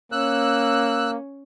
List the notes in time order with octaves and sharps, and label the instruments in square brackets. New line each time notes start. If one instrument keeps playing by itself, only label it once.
[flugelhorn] A#3 [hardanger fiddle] C#4 [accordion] E6 F#6